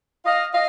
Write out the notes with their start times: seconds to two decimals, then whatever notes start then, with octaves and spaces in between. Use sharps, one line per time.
0.25 D#5 F5
0.53 D#5 F5